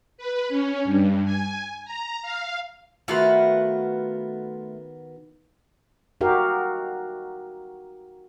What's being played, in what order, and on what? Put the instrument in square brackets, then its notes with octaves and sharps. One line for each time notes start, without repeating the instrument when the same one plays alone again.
[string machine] B4
C#4
G2
G#5
A#5
F5
[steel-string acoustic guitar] D#3 B3 F#4 [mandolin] A3 F4 B4
[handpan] D#4 F#4 G4 A#4 F5